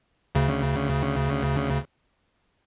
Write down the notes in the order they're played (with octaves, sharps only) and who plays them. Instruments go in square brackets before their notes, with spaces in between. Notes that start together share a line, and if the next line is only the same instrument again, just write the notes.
[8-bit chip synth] D2 C#3